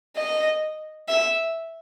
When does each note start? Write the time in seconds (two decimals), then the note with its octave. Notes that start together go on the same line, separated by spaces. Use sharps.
0.17 D#5
1.08 E5